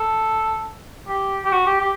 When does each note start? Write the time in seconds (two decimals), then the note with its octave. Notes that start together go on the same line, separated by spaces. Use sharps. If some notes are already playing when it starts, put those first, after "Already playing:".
Already playing: A4
1.08 G4
1.45 G4
1.52 F#4
1.66 G4
1.81 G4